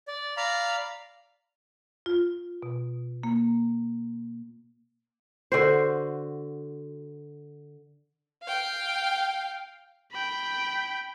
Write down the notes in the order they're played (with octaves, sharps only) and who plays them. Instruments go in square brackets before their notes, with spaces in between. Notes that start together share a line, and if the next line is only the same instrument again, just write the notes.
[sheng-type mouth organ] D5
D5 F5 A#5 B5
[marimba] F4
B2
A#3
[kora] D3 F#4 C5
[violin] F5 G5
[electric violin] G5 B5